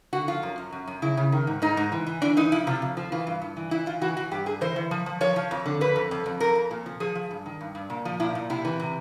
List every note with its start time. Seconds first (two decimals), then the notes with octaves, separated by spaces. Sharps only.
0.13 D3 F#4
0.28 F3 F4
0.43 F#2
0.58 F#2
0.73 F#2
0.87 F#2
1.02 C#3 E4
1.17 C#3
1.32 D#3
1.47 G#2
1.62 G#2 D#4
1.77 G#2
1.92 E3
2.07 E3
2.22 E3 D4
2.37 E3 D#4
2.52 F3 E4
2.67 C3 F4
2.82 F2
2.97 F3
3.12 E3 F4
3.27 G2
3.42 G2
3.57 E3
3.71 E3 E4
3.86 E3 F4
4.01 E3 F#4
4.16 E3 F#4
4.31 G2 G4
4.46 G2 G#4
4.61 E3 C5
4.76 E3
4.91 F3
5.06 F3
5.21 F3 C#5
5.36 F3
5.51 F2
5.66 D3
5.81 F2 B4
5.96 F2
6.11 F2
6.26 F2
6.40 F2 A#4
6.55 F2
6.71 A#2
6.86 F3
7.00 F3 G#4
7.15 F3
7.31 G2
7.46 D#3
7.61 G2
7.75 G2
7.90 A#2
8.05 F3
8.20 A#2 E4
8.35 A#2
8.50 C3 E4
8.65 E3
8.80 C3